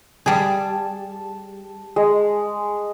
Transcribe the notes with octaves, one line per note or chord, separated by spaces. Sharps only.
G3 G#4 A5
G#3